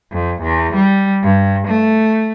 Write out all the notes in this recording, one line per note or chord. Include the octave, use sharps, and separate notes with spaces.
F2
E2
G3
G2
A3